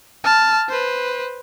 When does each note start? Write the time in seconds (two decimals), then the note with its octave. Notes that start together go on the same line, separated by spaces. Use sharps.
0.24 A5 F6
0.69 B4 C5